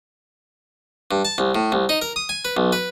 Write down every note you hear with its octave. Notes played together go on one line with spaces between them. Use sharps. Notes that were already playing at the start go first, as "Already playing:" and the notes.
G2
A5
C2
A2
C2
D#4
A#4
D#6
G#5
B4
B1
B4